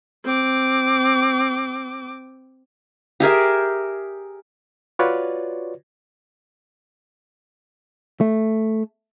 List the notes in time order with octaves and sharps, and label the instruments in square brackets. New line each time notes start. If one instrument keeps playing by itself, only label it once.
[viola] C4 D6
[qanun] G4 G#4 A#4 E5
[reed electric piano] F4 F#4 B4 C#5 D5
[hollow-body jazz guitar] A3